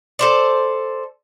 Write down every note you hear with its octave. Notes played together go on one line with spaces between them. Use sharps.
A4 C5 D5